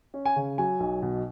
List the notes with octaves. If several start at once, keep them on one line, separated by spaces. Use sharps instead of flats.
C#4
G#5
C#3
F#3 G#5
B1
B2